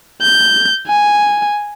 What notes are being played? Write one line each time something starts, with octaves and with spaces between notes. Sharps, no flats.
G6
G#5